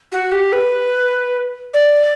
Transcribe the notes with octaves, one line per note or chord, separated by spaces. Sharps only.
F#4
G4
B4
D5